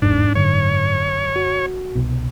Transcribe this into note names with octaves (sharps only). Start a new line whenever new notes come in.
G1 E2 G#2 D4
F#2 D3 C#5
F#4
C2 B2